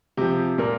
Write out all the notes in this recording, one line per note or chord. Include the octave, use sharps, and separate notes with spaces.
C3 F3 G4
A#2 A#4